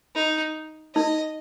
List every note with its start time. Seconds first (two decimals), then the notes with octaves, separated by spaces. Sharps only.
0.15 D#4
0.95 D#4 D#5